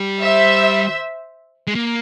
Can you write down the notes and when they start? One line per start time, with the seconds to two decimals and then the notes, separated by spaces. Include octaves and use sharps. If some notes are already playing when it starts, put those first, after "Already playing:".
Already playing: G3
0.21 C5 E5
1.67 G#3
1.75 A#3